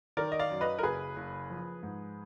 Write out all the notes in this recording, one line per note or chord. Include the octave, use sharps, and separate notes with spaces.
D#3 A#4 D5
D#5
D5 F5
F#2
B4 D#5
A#4
F#1 G#4 B4
F#1
F3
G#2